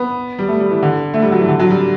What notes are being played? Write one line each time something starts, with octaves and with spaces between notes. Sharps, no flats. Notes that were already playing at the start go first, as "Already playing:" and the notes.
Already playing: B3
G3
A3
G3
E3
D3
A3
G3
F#3
E3
D3
F#3
G3